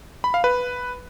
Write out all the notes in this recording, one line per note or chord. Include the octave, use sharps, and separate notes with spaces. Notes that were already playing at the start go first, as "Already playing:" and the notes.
B5
F5
B4